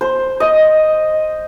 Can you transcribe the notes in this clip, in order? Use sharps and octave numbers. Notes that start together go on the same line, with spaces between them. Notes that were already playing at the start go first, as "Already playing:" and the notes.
C5
D#5